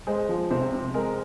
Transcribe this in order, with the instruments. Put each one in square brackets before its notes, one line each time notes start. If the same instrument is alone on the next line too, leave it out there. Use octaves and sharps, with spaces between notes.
[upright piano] G#3 C5
F3
C3 C5
C4
G#3 A#4